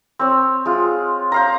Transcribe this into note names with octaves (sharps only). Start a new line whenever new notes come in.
C4 C#5
G#3 F4
C5 F5 A#5